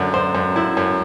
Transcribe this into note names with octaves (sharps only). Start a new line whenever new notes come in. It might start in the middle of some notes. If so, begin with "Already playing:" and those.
Already playing: F#2 D3
F#2 C5
F#2
F#2 E4
F#2